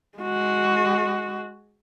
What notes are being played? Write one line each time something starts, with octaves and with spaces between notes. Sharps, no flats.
G#3 F#4